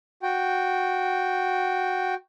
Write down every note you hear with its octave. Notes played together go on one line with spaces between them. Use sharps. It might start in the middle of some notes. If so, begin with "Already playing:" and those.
F#4 G5